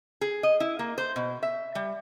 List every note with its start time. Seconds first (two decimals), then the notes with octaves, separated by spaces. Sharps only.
0.21 G#4
0.43 D#5
0.60 E4
0.79 A#3
0.98 C5
1.16 B2
1.43 E5
1.75 G3